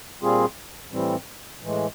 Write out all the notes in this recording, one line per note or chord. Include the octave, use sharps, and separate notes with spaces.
A#2 G3 C4 F4 G#4
A2 E3 G3 C4
A2 E3 G#3